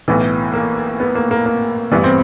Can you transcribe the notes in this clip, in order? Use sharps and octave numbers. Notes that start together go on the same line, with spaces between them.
B1 A2 E3 B3
A#3
B3
A#3
A#3
A#3
A1 G2 E3 B3
C4